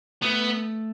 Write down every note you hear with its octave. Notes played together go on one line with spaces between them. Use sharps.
A3 B3